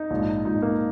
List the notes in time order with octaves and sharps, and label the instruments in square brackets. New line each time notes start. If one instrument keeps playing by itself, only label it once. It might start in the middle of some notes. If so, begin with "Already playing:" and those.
Already playing: [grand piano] D#4
A#1 G#2 F3
A#1 G#2 F3 D#4
A#3